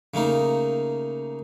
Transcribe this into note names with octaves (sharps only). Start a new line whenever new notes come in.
C#3 A3 A#3 D#4